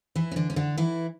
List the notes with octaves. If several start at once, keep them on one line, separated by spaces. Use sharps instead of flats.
E3 E4
C#4
D3 D4
C#4
D3 D4
E3 E4